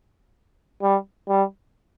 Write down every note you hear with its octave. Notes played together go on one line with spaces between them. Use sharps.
G3
G3